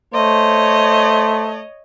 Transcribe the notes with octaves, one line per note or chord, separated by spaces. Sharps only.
A3 C5 C#5 D#5